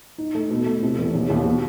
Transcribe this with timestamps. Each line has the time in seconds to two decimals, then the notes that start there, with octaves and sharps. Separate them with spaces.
0.18 D#4
0.35 A3
0.50 B2
0.66 A3
0.83 C3
0.98 E2
1.14 D#2
1.30 D#2
1.46 B2